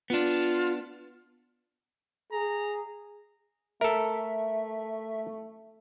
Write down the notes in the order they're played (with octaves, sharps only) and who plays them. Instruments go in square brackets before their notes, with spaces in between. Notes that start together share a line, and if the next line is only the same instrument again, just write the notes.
[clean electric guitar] B3 D4 [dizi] F4
[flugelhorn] G#4 [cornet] A#5
[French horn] A3 [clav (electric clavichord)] A4 A#4 [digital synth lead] E5